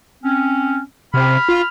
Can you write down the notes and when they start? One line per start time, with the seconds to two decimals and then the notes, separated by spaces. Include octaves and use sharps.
0.24 C4 C#4
1.14 C3 B5 F6
1.49 F4